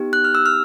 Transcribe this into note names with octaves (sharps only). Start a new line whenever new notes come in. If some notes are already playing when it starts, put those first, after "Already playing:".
Already playing: B3 D#4 G4
F#6
F6
E6
F6